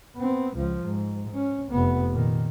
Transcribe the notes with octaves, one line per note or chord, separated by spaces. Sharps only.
B3 C4
C#2 F3
G#2
C#4
F1 B3
A#2 D#3